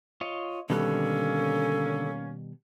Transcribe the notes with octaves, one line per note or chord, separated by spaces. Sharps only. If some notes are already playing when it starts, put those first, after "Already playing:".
F4 C#5 D#5
B2 D3 D#3 G3 A#3 C#4 A4 F#6